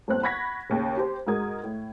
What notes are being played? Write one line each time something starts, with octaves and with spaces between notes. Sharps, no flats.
G1 D#2 C4 F#6
F#5 B5 C#6 G#6 A#6 B6
D#2 C#3
G4 C5
G#2 G#3 F#4 A#4 D#6 G#6
A2